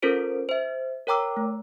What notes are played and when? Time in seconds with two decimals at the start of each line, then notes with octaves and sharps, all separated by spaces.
0.02 C#4 F4 A4 A#4 C5 D7
0.49 C5 E5
1.07 A#4 C#5 G5 A#5 D6 E6
1.37 A3